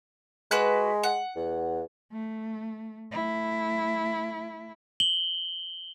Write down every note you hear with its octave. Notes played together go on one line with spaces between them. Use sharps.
G#3 F#4 B4 F#6
F#5
E2
A3
A3 E4
F#7 G7